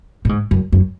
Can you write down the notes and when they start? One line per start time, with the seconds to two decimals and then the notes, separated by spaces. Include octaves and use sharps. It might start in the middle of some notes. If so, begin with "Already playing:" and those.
0.25 A2
0.29 G#2
0.51 F#2
0.72 F#2